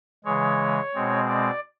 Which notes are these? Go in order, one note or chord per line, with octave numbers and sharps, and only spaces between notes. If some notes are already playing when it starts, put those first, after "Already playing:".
C#3 E3 G#3 C#5
B2 G#3 C4
D5